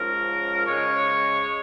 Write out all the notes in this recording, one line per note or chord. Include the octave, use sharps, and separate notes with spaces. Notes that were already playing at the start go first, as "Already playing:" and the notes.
Already playing: G#2 F3 C#4 A#4
C#3 G#3 C#4 C#5